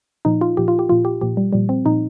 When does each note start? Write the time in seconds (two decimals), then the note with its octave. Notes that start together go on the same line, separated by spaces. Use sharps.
0.25 A#2 F3 D#4
0.41 F4
0.57 A#2 F3 G4
0.68 F4
0.79 G4
0.89 A#2 F3 F4
1.05 G4
1.21 A#2 F3 G4
1.37 G3
1.53 A#2 F3 G3
1.69 C4
1.85 A#2 F3 D#4